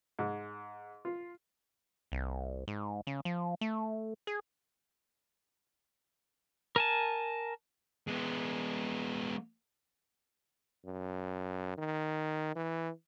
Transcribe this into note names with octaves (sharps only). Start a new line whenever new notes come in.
G#2
F4
C2
G#2
C#3
F3
A3
G#4
A#4 G#5 A5
G#3 B3
F#2
D#3
E3